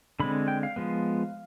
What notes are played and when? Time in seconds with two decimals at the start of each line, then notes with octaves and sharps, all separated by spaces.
0.20 D3 G#3 C4 B5
0.48 G5
0.63 F5
0.76 F3 G#3 B3